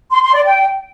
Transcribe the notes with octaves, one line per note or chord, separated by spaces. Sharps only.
C6
C6
D5
G5